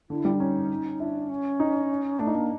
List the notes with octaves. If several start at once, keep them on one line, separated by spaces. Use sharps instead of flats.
D3 E4
G3
D4
C#4 D#4
D4 E4
C#4
D#4
A3 D4
D#4
A#3 D4